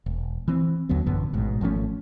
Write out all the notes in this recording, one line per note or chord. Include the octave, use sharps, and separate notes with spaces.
E1
E3 C4
D#2 D3 F#3 B3
A1 F#2 D3 B3
A1 G#2 B2
G#1 F3 A3 C#4